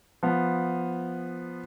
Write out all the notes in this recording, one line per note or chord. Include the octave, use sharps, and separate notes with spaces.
F3 B3